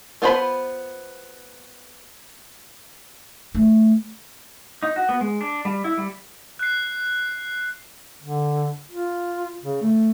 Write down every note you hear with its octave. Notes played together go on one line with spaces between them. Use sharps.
B3 F4 C5 A#5 B5
A3
D#4
F#4
B3
G#3
D4
G3
E4
G3
F#6 C7
D3
F4
C#3
A3